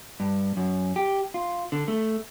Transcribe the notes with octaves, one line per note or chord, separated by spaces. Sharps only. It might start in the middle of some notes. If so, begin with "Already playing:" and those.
G2
F#2
G4
F4
D3
A3